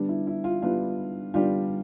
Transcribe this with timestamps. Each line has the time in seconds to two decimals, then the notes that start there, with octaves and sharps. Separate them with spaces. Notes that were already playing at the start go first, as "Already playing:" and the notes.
Already playing: D3 G3 B3 D4
0.09 E4
0.27 E4
0.44 F4
0.62 D3 G3 B3 D4 F4
1.34 D3 G3 B3 D4 F4 G4